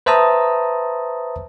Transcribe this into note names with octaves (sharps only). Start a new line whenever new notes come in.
B4 C5 E5 A5 A#5 D#6